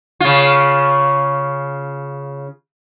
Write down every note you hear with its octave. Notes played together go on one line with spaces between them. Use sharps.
C#3 F4